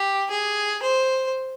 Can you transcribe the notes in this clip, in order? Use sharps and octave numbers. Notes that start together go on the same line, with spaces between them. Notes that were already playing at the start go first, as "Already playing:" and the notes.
Already playing: G4
G#4
C5